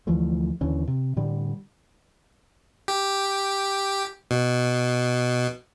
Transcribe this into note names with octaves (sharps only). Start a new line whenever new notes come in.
D2 E3 F3 A3
D#2 D3 E3 C#4
C3
A2 D3 G3
G4
B2